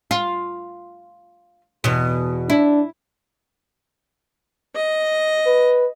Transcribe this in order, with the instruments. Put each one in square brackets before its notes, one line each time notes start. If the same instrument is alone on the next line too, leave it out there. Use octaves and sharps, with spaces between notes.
[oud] F4
E2 B2
[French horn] D4 [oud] E4
[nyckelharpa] D#5
[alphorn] B4